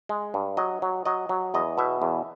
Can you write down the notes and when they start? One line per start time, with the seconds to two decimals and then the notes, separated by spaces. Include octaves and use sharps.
0.09 G#3
0.34 G2
0.57 F#3 D#5
0.82 F#3
1.05 F#3 D#5
1.29 F#3
1.54 E2 D#5
1.78 B2 E5
2.02 E2